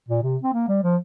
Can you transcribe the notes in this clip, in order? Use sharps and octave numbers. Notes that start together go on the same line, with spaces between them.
A#2
C3
C4
A#3
G3
F3